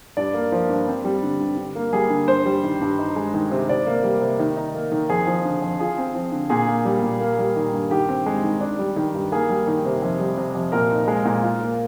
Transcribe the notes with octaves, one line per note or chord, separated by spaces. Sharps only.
G2 D5
A#3
F3
G2
C4
G3
D3
G2
D3
A#3
G3 G#4
D3
G2 C5
G3
D#3
G2
D#4
G#3
D#3
C3
C3 D5
A#3
G3
C3
D#3
D#4
A#3
D#3
F2 G#4
F3
D3
F2
F4 G#4
C4
F3
D3
A#2 G#4
A#3
G3
A#2
A#3
G3
D#3
G2
D#3 G4
C4
G#3
D#3
D4
G3
D#3
G2
A#3 G#4
G3
D#3
C3
F2
G3
C3
F2
A#2 A#4
D#4
G#3
A#2
F4
A#3